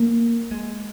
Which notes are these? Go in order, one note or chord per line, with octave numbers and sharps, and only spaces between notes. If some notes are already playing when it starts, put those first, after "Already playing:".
Already playing: A#3
G#3